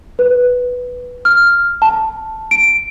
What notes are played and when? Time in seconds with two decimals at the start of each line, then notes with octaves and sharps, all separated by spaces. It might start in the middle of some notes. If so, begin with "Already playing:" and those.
0.19 B4
1.25 F6
1.82 A5
2.51 D7